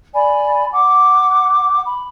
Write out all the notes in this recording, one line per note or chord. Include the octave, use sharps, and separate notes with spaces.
D5 G#5 B5
F#5 D6
B5